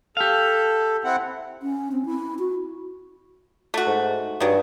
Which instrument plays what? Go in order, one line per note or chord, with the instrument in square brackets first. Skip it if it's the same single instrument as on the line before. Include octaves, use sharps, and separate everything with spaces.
[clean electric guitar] G4 F5 [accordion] A4
[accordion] C4 E4 F#5
[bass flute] C#4
C4
E4
F#4
[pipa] A3 F#4
[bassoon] G#2
[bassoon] G2 [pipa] D#3 F#3